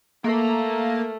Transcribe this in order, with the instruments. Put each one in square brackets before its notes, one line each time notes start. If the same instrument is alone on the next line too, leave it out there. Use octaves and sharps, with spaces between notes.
[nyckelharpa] A3 [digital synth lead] A#3